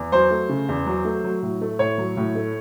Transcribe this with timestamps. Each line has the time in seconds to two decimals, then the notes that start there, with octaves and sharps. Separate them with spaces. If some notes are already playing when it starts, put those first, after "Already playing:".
Already playing: E2
0.12 F#3 C5
0.31 A3
0.49 C#3
0.69 E2
0.87 F#3
1.05 A3
1.24 F#3
1.43 A2
1.61 A3
1.79 A2 C#5
1.98 F#3
2.17 A2
2.35 A3